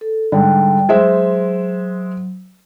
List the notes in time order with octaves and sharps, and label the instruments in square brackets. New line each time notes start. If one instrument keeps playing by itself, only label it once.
[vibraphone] A4
[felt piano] G#2 D3 [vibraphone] G3 G5
[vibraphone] F#3 [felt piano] G#3 C5 E5